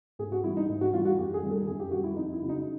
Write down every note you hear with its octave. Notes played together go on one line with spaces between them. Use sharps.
G#2 G#4
F#4
E3 G3 E4
D#4
G#2
F#4
E3 G3 F4
F#4
F#2 G4
G#4
D#3 G3
A4
F#2 G#4
G4
D#3 G3 F#4
E4
F2 D#4
E4
C#3 F#3
D#4